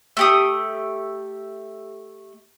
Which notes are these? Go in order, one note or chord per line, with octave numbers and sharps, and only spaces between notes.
A3 G4 D#6